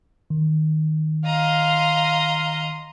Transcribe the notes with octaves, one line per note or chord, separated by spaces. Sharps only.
D#3
D#5 F5 A#5 C6